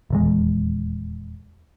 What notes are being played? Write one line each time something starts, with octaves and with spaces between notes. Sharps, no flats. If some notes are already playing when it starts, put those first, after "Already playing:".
D#1 E2 G#3